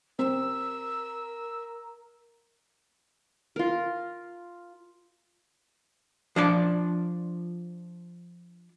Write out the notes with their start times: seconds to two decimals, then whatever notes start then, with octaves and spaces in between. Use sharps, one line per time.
0.19 C4 A#4 E6
3.56 F4 A#4
6.36 F3 D4 D5